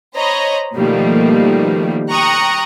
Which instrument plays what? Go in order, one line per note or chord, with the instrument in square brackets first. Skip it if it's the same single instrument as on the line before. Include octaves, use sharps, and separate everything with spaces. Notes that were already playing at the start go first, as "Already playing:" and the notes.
[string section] C5 C#5 D#5 A#5 B5
B2 D#3 F3 G3 A3 A#3
G5 A#5 C#6 D#6 F#6